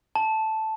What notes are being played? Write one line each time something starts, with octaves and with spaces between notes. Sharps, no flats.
A5